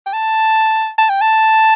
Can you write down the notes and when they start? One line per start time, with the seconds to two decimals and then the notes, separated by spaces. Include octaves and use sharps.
0.06 G5
0.13 A5
0.98 A5
1.10 G5
1.21 A5